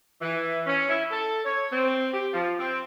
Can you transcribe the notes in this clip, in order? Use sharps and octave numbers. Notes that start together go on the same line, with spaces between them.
E3
C#4
E4
A4
C#5
C4
G4
F3
C4